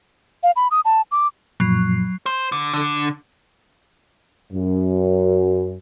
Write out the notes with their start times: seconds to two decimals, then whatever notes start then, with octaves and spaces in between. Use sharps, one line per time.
0.43 F5
0.56 B5
0.71 D#6
0.85 A5
1.12 D6
1.60 F#2 A#2 F3 F#3 C7
2.26 C5
2.52 D3
2.74 D3
4.53 F#2